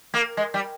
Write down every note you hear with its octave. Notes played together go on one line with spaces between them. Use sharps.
A#3
G#3
G3